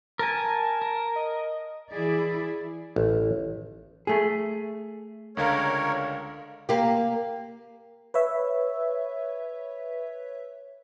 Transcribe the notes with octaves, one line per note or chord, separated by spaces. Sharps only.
A#4 G#5 A5
A#4
D#5
E3 E4 G#4 D5
A1
A3 G#4
C#2 D3 A#4 C#5 F5
A#3 G4
B4 C#5 E5